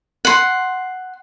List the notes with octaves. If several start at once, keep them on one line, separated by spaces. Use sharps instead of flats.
F#5 C6